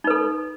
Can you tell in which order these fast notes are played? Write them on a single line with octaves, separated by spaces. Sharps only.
D#4 B4 A4